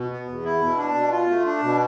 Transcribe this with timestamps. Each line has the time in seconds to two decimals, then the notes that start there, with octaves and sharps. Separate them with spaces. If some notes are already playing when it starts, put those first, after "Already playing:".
Already playing: B2
0.11 B3
0.27 E2
0.45 E4
0.61 B2
0.78 D4
0.95 B2
1.12 F4
1.30 A3
1.46 D4
1.62 B2